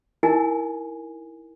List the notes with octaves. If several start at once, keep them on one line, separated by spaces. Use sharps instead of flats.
D#4 E4 A#4 G#5